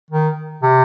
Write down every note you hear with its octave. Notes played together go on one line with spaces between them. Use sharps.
D#3
C3